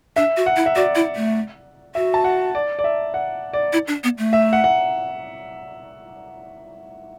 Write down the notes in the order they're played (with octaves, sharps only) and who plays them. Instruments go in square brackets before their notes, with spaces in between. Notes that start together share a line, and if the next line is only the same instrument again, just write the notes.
[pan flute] D4 [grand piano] E5
[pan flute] F#4
[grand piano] F#5
[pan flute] E4
[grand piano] E5
[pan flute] F#4 [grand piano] D5
[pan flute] E4
A3
[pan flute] F#4 [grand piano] E5
[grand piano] A5
F#5
D5
D5
E5
F#5
D5
[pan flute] E4
D4
B3
A3
[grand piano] E5
F#5
F#5